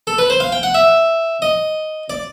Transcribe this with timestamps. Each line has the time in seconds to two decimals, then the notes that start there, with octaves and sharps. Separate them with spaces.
0.07 A4
0.18 B4
0.30 C5
0.40 F5
0.52 G5
0.63 F#5
0.74 E5
1.42 D#5
2.10 D5